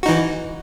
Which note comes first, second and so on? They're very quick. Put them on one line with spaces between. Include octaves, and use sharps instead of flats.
F#4 D#4 E3